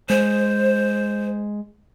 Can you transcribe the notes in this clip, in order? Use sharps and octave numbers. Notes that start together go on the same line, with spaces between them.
G#3 C5